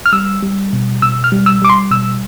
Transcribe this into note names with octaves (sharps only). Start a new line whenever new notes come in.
F6
G3 E6
G3
B2
B2 E6
F6
G3
E6
G3 D6
C6
B2 E6